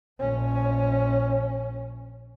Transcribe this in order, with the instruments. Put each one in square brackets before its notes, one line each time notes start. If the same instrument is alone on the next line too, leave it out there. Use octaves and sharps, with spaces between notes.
[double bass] A#1 C#4